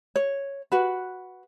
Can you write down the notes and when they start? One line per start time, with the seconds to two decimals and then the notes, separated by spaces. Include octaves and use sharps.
0.16 C#5
0.72 F#4 B4